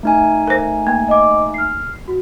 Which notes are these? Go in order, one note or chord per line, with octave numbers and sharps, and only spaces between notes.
A3 D#4 G#5
A#4 C5
A#3
D#5 D6
F6 C7
F#4